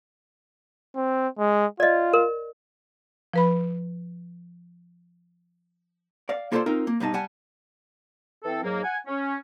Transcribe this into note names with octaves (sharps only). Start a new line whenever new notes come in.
C4
G#3
F4 D5 D#5
A#4
F3 B4 B5
D5 F5
A#3 F4 A4 C5 D5 C6
C4 D#4 F4 A#4
A#3
G2 B2 D#4 A5
G3 F#5 G#5 A5
E3 C4 A4
G#2 F#3 A#3
F#5 G#5
C#4